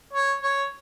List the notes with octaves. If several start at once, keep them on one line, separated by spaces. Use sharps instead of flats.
C#5
C#5